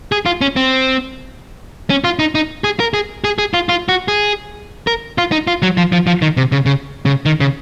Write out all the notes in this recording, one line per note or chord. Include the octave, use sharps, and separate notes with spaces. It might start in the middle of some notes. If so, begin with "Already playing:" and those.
G#4
F4
C#4
C4
C#4
F4
D#4
D#4
G#4
A#4
G#4
G#4
G#4
F4
F4
F#4
G#4
A#4
F4
D#4
F4
F#3
F3
F3
F3
D#3
C3
C#3
C#3
C#3
D#3
C#3